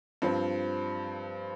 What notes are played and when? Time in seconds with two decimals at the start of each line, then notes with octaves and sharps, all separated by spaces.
0.22 G2 F3 C4